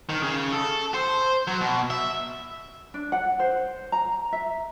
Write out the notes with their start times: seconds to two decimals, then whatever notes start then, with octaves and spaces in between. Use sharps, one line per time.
0.09 D#3
0.23 C#3
0.52 A4
0.94 C5
1.47 F#3
1.61 B2
1.90 E5
2.94 D4
3.12 F#5
3.39 C5
3.92 A#5
4.33 E5